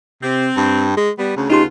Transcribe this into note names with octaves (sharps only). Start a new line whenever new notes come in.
C3 C4
G2
G#3
G3 B3
D2 C#3
A3 B3 D#4 F4 G4 C6